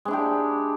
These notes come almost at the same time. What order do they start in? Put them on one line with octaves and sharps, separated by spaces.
G#3 D4 E4 G4